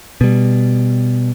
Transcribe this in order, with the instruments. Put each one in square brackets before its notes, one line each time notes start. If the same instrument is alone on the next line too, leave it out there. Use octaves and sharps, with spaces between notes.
[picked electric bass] B2 G3